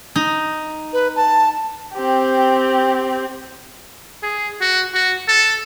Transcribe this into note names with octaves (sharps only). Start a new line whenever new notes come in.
D#4
B4
A5
C4 G4
G#4
F#4
F#4
A4